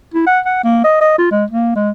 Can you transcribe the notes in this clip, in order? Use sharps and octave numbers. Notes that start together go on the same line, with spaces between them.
E4
F#5
F#5
A#3
D#5
D#5
F4
G#3
A#3
G#3